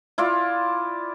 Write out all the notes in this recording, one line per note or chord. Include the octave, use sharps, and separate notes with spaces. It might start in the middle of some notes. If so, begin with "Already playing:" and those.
E4 F4 D5